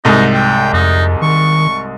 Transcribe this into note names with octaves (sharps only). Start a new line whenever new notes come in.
C2 G#2 D#4
G5
F2 D#4
D#3 C#6